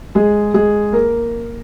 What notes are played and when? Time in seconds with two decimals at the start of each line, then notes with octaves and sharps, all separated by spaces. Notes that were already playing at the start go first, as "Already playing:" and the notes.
0.15 G#3 G#4
0.54 G#3 G#4
0.92 A#3 A#4